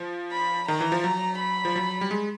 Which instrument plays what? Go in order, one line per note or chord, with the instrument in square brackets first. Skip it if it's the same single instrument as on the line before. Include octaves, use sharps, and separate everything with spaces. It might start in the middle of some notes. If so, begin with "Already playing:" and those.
Already playing: [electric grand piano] F3
[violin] B5
[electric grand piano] D#3 [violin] A#5
[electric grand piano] E3
F3
[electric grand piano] F#3 [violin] A#5
[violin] B5
[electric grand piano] F3
F#3
G3
G#3